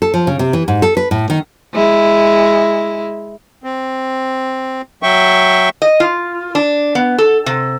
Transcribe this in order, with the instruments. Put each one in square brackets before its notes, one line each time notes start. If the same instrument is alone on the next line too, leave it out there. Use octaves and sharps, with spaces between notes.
[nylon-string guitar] A4
F3
C#3
C3
E3
G#2
A4
B4
A2
D#3
[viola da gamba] G#3 E4
[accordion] C4
F#3 E5 G5 C#6
[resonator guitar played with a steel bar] D#5
F4
D4
B3
A4
C3